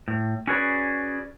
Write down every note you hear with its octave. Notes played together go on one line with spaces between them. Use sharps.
A2
C#4 F#4 G#4 B4 D5